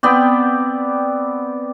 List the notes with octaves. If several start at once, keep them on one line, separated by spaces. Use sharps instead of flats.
B3 C4 D5 G5